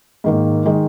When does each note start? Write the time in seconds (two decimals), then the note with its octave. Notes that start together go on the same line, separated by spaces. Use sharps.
0.24 G#2 D#3 A#3
0.66 D#3 G#3